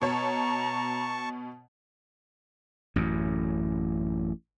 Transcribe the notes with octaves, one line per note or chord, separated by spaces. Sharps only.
B2 C#5 A5 A#5 C#6
A1 F#2